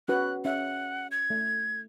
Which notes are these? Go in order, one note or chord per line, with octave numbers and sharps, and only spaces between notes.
C#4 F#4 B4 F#6
C#4 E5 F#5
G#6
A3